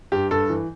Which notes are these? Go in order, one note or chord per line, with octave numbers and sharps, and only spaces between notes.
G2 G4
G2 A4
E3